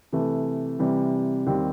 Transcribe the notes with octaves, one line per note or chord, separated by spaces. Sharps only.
C3 E3 A3
C3 E3 G3
D#2 D#3 G3 C4